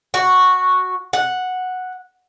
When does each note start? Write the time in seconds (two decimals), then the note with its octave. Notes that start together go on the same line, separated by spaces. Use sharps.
0.14 F#4
1.13 F#5